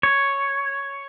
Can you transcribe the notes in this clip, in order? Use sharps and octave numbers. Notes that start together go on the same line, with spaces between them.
C#5